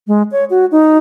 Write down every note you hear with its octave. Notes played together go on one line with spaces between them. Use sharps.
G#3
C#5
F#4
D#4